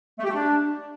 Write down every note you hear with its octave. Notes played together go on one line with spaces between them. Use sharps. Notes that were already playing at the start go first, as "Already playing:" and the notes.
A3
G4
A3
D4